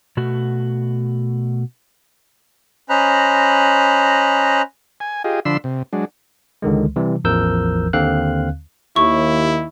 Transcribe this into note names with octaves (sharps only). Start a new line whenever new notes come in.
B2 A3 F#4
C#4 C5 D#5 A#5 B5 F#6
G#5
F4 G4 G#4 D#5
D3 F3 D4 B5 C6 E6
C3
F#3 G#3 D4
C#2 D3 D#3 G#3
C3 E3 G3
A1 E2 F3 A#4 E6 G6
D#2 D3 C4 F5 F#6
D#2 E4 C#6